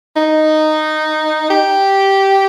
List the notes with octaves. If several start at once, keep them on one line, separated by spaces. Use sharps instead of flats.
D#4
G4